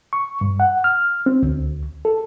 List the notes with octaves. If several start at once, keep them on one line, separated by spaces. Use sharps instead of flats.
C#6
G2
F#5
F6
C4
D2
A4